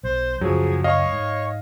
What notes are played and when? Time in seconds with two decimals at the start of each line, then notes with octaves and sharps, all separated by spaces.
0.04 B1 C5
0.41 C#2 F#2 F3 F#3 G#4
0.84 C#5 D#5 F5
1.13 G#2